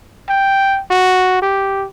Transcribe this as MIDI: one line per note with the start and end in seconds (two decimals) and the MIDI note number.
0.29 0.81 79
0.91 1.41 66
1.42 1.86 67